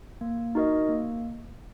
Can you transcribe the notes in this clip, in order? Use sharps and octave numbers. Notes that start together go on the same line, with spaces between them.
A#3
D#4 F#4 A#4 D#5
A#3